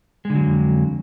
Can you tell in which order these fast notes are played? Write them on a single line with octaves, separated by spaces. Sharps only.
G#3 D3 F#3 G#2 F2